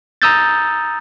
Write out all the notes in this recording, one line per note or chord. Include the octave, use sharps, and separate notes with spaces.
A#5 D#6 E6 G6 A6